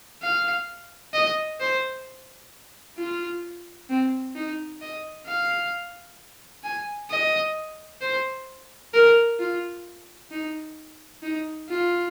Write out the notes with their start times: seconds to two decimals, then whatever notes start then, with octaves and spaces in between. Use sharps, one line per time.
0.22 F5
1.14 D#5
1.60 C5
2.98 F4
3.90 C4
4.36 D#4
4.81 D#5
5.27 F5
6.64 G#5
7.10 D#5
8.01 C5
8.94 A#4
9.39 F4
10.31 D#4
11.23 D#4
11.69 F4